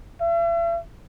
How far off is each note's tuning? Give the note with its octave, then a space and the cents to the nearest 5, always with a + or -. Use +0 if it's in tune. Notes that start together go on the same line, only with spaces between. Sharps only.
E5 +45